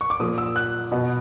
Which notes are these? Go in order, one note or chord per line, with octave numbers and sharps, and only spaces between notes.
C#6
D6
A#2 F3 D#6
E6
F#6
B2